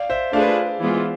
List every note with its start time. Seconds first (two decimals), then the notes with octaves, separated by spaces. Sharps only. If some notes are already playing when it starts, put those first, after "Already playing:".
Already playing: D5 F5
0.10 C5 E5
0.33 A3 D4 F4 G#4 B4 D5 F5
0.80 E3 G#3 B3 F4